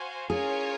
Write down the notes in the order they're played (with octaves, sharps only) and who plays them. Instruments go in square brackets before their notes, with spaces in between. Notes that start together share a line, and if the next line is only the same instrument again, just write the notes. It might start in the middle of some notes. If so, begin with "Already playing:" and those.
Already playing: [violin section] F#4 C5 F5 G#5
[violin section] C#4 F4 A#4 C#5 G#5 [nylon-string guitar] G#4